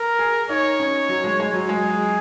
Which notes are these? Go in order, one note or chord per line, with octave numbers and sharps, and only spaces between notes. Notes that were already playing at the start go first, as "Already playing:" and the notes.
Already playing: A#4
G#4
D#4 C#5
C#4
F#3
G#3
G#3
F#3
G#3 G#4